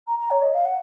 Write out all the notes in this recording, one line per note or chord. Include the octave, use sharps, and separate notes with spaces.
A#5
A#5
C#5
D#5
F5
F#5